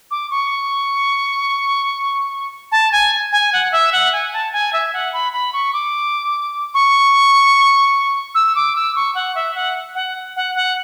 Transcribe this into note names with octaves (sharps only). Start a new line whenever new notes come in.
D6
C#6
A5
G#5
G#5
F#5
E5
F#5
G#5
A5
G#5
E5
F#5
B5
B5
C#6
D6
C#6
E6
D6
E6
C#6
F#5
E5
F#5
F#5
F#5
F#5